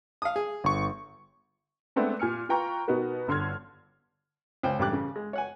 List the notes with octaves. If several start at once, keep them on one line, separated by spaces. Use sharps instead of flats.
F5 D#6
G#4
G1 C#6
G#3 A3 B3 C4 D4
A#2 G#5 F6 C#7
F4 B4 G5 A#5 C#6
B2 B3 D#4 F#4 A#4
G1 D3 C6 F6 G#6
C#2 C5 G5
A1 G2 G4 G5 D6 F#6
C#3
G#3
C#5 F#5 G#5